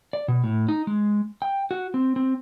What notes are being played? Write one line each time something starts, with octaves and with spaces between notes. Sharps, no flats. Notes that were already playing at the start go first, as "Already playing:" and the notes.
D5
B2
A2
D#4
G#3
G5
F#4
C4
C4